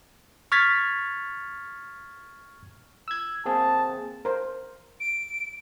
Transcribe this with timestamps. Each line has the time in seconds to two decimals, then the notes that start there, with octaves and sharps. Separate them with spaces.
0.52 C#6 F6 G#6 A6 B6
3.08 E6 G#6
3.46 A#3 C4 G#4 A5
4.25 A#4 C5
5.00 D7